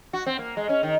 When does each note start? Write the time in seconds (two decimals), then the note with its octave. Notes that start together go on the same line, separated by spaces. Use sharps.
0.13 F#4
0.26 C4
0.39 A#3
0.57 G#3
0.69 C#4
0.83 D#3